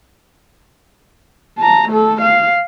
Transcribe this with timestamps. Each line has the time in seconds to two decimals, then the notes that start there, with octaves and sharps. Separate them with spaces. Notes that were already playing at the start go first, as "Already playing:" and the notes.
1.58 A5 A#5
1.89 A3 A4
2.21 F5